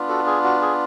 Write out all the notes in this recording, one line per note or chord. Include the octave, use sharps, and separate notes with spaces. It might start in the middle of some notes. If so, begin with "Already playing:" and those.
Already playing: B3 D4 F4
F#4 A4
G#4
F#4
G#4